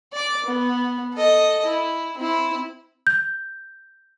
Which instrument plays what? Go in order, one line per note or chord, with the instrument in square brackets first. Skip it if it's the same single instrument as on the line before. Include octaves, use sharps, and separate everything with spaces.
[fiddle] D5 D6
B3
A4 D#5
E4
C4 E4
[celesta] G6